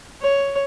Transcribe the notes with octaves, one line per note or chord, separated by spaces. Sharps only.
C#5